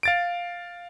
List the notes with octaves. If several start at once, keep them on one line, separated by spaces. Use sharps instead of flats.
F5 A6 D7